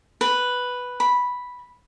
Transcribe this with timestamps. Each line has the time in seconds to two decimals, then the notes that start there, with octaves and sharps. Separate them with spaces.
0.21 B4
1.00 B5